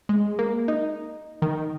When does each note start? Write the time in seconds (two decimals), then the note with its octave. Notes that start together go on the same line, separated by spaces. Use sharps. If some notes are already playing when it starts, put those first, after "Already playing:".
0.09 G#3
0.39 A#3
0.68 D#4
1.42 D#3